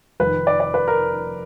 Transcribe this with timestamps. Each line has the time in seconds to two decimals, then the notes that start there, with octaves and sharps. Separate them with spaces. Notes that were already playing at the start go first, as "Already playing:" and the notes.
0.20 F1 F2 D#3 B4
0.47 D5
0.60 D5
0.74 B4
0.88 A#4